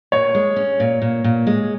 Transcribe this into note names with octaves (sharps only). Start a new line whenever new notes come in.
A#2 C#5
G#3
C#4
A#2
A#2
A#2
G#3